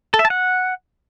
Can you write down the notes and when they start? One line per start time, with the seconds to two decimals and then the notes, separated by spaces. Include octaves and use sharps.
0.14 A4
0.19 E5
0.25 A5
0.30 F#5